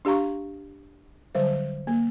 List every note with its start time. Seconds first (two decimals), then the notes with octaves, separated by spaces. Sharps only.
0.05 D4 G4 F5 A#5 C#6
1.35 D3 F#3 G3 C5
1.87 A#3